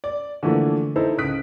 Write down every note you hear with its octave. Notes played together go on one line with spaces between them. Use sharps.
D5
D3 E3 F3 A3 A#3
D#4 E4 A4 C5
C#2 D#6 F#6 B6 D7